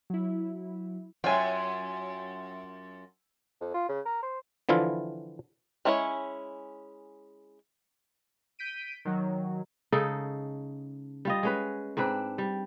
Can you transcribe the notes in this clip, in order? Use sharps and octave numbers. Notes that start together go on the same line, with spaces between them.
F#3 E4
F#2 F4 C#5 E5 G5 G#5
F2
F4
C#3
A#4
C5
D3 E3 F3 E4 F4
G#3 C#4 E4 F4 C#5
G6 B6 D7 D#7
D#3 F#3
C#3 G#3 D#4 A4
G3 F4 D#5
G#3 C#4 B4
G#2 C4 D4 B4
G3